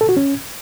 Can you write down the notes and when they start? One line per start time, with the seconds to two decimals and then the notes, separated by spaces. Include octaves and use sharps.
0.01 A4
0.09 F#4
0.17 C#4